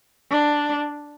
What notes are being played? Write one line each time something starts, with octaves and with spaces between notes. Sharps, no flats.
D4